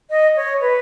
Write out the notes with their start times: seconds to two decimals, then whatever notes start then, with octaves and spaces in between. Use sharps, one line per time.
0.10 D#5
0.36 C#5
0.61 B4